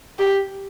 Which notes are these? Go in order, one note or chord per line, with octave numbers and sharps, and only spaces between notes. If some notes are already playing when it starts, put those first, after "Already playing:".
G4